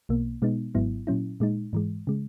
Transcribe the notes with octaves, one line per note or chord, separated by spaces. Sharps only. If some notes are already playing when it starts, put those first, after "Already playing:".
B1 B2 A#3
B2 G#3 B3 D#4
G#1 G#2 F#3 B3 E4
A#2 F#3 C#4 E4
A#2 G#3 D#4
G#2 E3 G#3
C#3 G#3